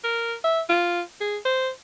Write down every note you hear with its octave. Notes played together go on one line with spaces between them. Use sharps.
A#4
E5
F4
G#4
C5